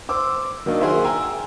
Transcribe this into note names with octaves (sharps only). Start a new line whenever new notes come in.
C5 D6 E6
D#3 F#3 A#3 D4 D#4
F#4 G#4 A#4 C5 E5
G5 G#5 A#5 E6